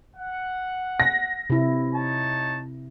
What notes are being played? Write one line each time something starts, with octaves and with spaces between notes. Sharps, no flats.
F#5
A#6
C3 E4
D#4 C#5 A5